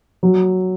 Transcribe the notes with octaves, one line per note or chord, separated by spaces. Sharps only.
F#3